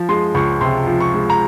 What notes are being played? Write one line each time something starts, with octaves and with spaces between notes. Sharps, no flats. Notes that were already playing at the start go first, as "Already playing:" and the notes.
Already playing: F3
G#3 C6
C#2 C#6
C3 C6
F3
C#6
G#3
A#5